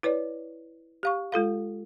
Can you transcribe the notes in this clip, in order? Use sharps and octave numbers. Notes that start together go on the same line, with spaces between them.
E4 B4 C#5 D5
G4 F5 C#6
G#3 F4 A4 F5